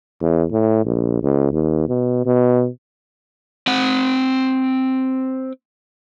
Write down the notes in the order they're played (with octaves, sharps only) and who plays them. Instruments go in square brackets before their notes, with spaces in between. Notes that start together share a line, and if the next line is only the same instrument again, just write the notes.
[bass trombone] E2
A2
A#1
C#2
D#2
B2
B2
[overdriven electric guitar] C4 F#5